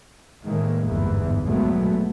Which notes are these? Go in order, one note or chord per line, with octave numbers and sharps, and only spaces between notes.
A2 D#3 E3 G#3 A#3
G1 E2 G#2 E3
A#1 B2 F#3 G#3 A3 B3